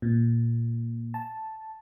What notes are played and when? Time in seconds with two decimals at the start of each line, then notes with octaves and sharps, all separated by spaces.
0.02 A#2
1.14 A5